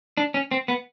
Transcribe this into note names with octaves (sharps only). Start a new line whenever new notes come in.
D4
C#4
C4
B3